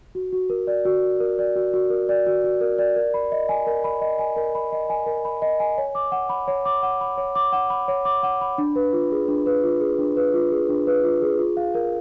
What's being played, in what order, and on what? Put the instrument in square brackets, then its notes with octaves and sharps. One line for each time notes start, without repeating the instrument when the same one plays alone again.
[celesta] F#4
F#4
A#4
D5
F#4
F#4
A#4
D5
F#4
F#4
A#4
D5
F#4
F#4
A#4
D5
A#4
B5
D#5
G#5
A#4
B5
D#5
G#5
A#4
B5
D#5
G#5
A#4
B5
D#5
G#5
C#5
D6
F#5
B5
C#5
D6
F#5
B5
C#5
D6
F#5
B5
C#5
D6
F#5
B5
D4
B4
F4
G#4
D4
B4
F4
G#4
D4
B4
F4
G#4
D4
B4
F4
G#4
F4
F5
A#4